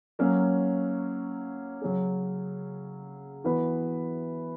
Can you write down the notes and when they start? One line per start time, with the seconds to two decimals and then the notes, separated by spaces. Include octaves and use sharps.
0.19 F#3 A#3 C#4
1.82 C#3 F#3 C#4 G#4
3.44 E3 B3 F#4 B4